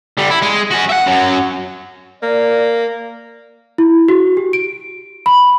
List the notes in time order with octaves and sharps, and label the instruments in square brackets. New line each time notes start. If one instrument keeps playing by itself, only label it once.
[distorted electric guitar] D3 G3
E4
G#3
C#4 F#4
E5 F#5
F#2 F#3
[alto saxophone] A#3 [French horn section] D5
[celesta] E4
F#4
G4
D7
B5